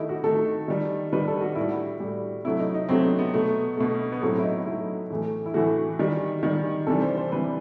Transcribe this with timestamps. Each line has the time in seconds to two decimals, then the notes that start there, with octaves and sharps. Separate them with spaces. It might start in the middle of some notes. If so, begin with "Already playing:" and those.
Already playing: D#3 A3 D#4 E4 G4
0.09 F#4
0.24 D#3 A3 A4
0.68 D#3 G3
1.13 D#3 G3 B4
1.28 A4
1.41 F#4
1.55 A2 G3 E4
1.68 F#4
2.00 A2 G3
2.44 C3 F#3 A3 E4
2.59 D#4
2.74 D#4
2.89 C3 F#3 A3 C4
3.04 B3
3.19 B3
3.34 B2 A3
3.77 B2 A3
4.12 B3
4.21 A2 F#3 A3 C4
4.39 E4
4.44 D#4
4.66 A2 F#3 A3 E4
5.10 A2 E3 A3
5.46 E4
5.54 A2 E3 A3 F#4
5.99 D#3 G3
6.43 D#3 G3
6.87 C3 E3 G3 A4
7.02 C5
7.17 C5
7.32 C3 E3 G3 B4